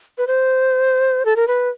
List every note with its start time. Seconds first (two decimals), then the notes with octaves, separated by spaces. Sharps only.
0.18 B4
0.27 C5
1.25 A4
1.36 A#4
1.48 B4